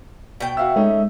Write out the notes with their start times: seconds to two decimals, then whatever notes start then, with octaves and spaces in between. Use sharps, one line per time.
0.40 B2 G5
0.57 F#4 E5 F5 E6
0.76 G#3 A3 C#4 D#4